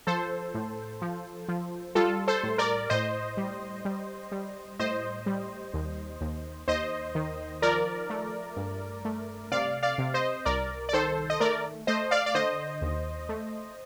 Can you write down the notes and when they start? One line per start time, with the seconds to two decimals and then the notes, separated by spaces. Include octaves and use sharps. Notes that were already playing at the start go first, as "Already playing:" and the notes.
0.07 F3 A4 C5
0.54 A2
1.02 F3
1.48 F3
1.95 G3 F4 A4
2.28 A4 C5
2.43 A2
2.58 A#4 D5
2.90 A2 C5 D#5
3.37 G3
3.85 G3
4.32 G3
4.79 A2 C5 D#5
5.26 G3
5.74 D#2
6.21 D#2
6.68 D#2 C5 D#5
7.15 D#3
7.62 F3 A#4 D5
8.10 A3
8.56 G2
9.05 A3
9.52 C3 D5 F5
9.83 D5 F5
9.98 C3
10.14 C5 D#5
10.45 C2 A#4 D5
10.89 D5
10.93 D#3 A4 C5
11.30 D#5
11.40 A3 A#4 D5
11.87 A3 C5 D#5
12.11 D5 F5
12.26 D5
12.35 D3 C5 D#5
12.82 D#2
13.29 A3